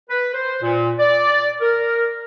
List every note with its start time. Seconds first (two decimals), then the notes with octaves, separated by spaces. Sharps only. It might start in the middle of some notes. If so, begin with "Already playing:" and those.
0.10 B4
0.34 C5
0.63 A#2
1.00 D5
1.61 A#4